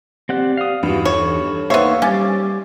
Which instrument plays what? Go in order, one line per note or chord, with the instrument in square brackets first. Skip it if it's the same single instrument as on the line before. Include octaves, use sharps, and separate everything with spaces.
[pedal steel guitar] C4 F#5 F#6 [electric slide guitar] G4 D5
[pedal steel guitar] F5 D#6
[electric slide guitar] E2 D#4 [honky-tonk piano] G2 [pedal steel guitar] E3 F4 F#4
[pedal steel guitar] A4 [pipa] C#5
[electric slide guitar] A#3 D#4 [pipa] B3 C#5 [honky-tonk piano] C5 E5 [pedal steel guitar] F5
[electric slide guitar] G3 [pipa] C#4 [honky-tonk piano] D6 A6